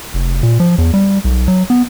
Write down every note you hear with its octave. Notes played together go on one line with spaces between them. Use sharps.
F1
A#2
F3
E2
G3
B1
F#3
B3